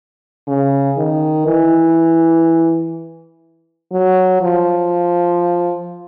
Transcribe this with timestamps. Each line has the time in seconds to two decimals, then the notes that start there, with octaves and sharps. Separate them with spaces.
0.47 C#3
0.97 D#3
1.46 E3
3.92 F#3
4.42 F3